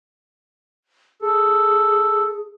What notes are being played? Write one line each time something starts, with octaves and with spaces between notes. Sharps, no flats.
G#4 A4